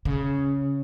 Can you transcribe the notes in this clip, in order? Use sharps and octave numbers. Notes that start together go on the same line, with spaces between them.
C#3